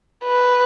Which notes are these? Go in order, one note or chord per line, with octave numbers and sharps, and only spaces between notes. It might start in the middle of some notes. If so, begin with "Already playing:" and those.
B4